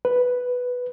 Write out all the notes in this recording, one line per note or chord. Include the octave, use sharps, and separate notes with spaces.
B4